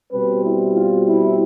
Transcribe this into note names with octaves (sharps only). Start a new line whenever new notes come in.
B2 G3 C4 B4
E4
F4
E4